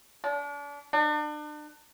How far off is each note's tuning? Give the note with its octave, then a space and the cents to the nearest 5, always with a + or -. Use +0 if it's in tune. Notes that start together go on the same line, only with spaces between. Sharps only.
D4 -35
D4 +40